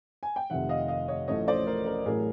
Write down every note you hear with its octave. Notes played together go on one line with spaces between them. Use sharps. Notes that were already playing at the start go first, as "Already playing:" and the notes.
G#5
G5
F1 F2 C3 D#3 E5 F#5
D#5 F5
D#5 F5
C#5 D#5
A1 A2 F3 A3 C#4 C#5 D#5
C5 D5
A#4 C5
A#4 C5
A1 A2 F#3 G#4 A#4